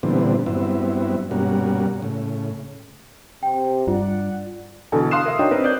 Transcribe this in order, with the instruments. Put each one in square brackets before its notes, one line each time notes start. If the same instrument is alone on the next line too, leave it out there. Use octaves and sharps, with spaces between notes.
[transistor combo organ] A#2 D3 E3 G3 B3 C4
G2 F#3 B3 C4 E4
G2 B2 G3 A#3 C#4 F#4
A2 C#3
[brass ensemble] C3 [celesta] G5
[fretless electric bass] G2 [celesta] F4 [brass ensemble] D5 F#5
[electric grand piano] B2 D3 E3 A4 G#5 A5
F5 C6 D#6 F#6 C7 E7
A#4 E5
D4 D#4 F#4 C#5 D#5 G5
C4 A#4 B4
D5 F#6 G6